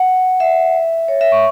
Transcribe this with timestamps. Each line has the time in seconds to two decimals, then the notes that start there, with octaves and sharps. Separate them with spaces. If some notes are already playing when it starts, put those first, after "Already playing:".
Already playing: F#5
0.40 E5
1.08 C#5
1.21 E5
1.32 C#6